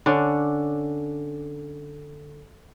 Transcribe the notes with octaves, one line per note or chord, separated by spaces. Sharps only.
D3 C#4 D4